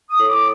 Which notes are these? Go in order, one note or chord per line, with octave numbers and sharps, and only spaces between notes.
D#6
A2
D6